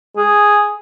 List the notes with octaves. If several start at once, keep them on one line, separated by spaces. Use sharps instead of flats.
G#4